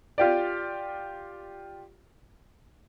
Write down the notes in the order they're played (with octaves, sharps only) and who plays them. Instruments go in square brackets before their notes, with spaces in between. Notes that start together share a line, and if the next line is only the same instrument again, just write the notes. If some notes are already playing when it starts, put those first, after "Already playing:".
[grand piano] F4 G4 D5